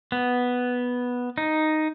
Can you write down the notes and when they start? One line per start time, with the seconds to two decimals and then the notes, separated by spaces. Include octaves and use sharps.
0.12 B3
1.38 D#4